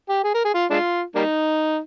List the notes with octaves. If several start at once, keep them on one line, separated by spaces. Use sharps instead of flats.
G4
G#4
A#4
G#4
F4
G#3 D4 F4
G3 A#3 D#4